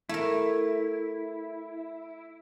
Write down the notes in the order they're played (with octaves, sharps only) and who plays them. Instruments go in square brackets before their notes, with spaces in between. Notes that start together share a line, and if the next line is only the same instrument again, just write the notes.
[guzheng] A3 A#4 [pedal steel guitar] E4